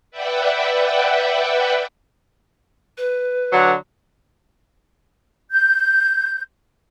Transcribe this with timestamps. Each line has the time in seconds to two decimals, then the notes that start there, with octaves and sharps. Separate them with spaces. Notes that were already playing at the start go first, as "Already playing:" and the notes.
0.11 B4 D5 E5 F#5 G5
2.97 B4
3.52 D3 F#3
5.51 G6